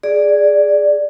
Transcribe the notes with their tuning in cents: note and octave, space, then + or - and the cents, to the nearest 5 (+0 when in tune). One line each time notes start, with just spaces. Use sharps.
G#4 +0 D5 +0